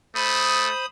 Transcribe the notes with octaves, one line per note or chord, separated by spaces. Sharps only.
A3 C5 B5 D#6